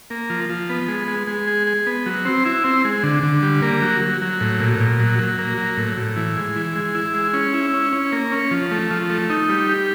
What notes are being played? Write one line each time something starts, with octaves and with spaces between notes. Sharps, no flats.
A#3
F3
F3
B3
G#3
G#3
G#3
G#4
G#4
B3
F#3
C4
E4
C4
G#3
D3
D3
G3
A#3
F#3
F#3
F#3
A2
A#2
A#2
F#3
F#3
A#3
F#3
A2
A2
E3
G#3
E3
G#3
E4
G#3
C#4
E4
C#4
C#4
A#3
C#4
F3
A3
F3
A3
D#4
G3
G4